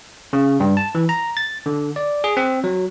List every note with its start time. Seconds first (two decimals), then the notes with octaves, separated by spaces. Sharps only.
0.33 C#3
0.60 G2
0.77 A5
0.95 E3
1.09 A#5
1.37 A6
1.66 D3
1.96 D5
2.24 G#4
2.37 C4
2.64 F#3